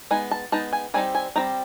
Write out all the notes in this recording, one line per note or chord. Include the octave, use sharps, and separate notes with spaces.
G#3 B3 D#4 G#5
A5
G#3 B3 D#4 A5
G#5
G3 C4 D#4 G#5
G#5
G3 C4 D#4 A#5